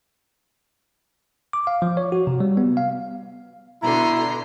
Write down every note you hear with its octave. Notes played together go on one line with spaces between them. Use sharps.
D6
F5
F3
C#5
F#4
C3
G3
B3
F5
B2 D3 E4 A#5 C6